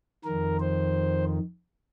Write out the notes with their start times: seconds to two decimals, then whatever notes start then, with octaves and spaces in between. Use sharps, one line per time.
0.24 F2 D#3 A#4
0.60 C5